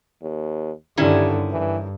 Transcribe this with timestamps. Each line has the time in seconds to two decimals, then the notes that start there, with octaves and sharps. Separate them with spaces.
0.22 D#2
0.97 G2 D3 D#3 G3 C#4 E4
1.51 G2 E3